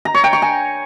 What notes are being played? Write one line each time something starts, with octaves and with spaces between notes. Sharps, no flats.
A#5
C#5
G5
C#6
G#5